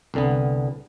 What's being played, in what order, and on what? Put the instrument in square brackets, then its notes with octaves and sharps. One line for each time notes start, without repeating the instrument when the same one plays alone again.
[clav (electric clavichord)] C2 D3 B3